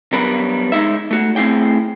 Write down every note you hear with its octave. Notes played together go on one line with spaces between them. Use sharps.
F#3 G3 B3 D4 A#4 B4
G#3 D#4 E5
A3 F#4
A3 C4 E4 G#4 G5